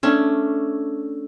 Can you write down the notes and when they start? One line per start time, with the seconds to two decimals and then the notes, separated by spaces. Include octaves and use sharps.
0.03 A3 C#4 D4